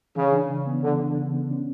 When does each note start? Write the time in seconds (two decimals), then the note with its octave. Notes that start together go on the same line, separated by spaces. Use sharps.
0.16 C#3 E3
0.33 D4
0.49 C#3
0.67 B3
0.83 D3 E3
1.00 D4
1.17 C#3
1.33 B3
1.51 C#4